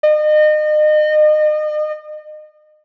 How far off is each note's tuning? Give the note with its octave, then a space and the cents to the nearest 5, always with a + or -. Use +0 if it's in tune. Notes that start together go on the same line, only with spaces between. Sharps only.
D#5 -35